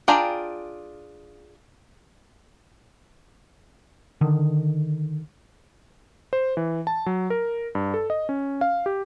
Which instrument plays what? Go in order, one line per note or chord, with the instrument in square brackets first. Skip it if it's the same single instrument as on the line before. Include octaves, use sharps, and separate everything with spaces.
[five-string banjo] D4 F4 G#4 G5 A#5
[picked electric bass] D3 D#3
[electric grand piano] C5
E3
A5
F#3
A#4
G2
A4
D#5
C#4
F5
G4